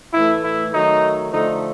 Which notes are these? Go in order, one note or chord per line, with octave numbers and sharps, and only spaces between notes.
A2 E3 A3 E4
E4
D#3 F#3 A3 D#4
D3 F3 A3 D#4